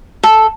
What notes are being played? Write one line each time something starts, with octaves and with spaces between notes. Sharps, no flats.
A4